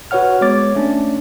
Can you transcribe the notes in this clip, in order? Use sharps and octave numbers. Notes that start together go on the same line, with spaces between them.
F#4 B4 C#5 F#5 F6
G#3 B3 C#5 D6 A6
A3 C#4 D4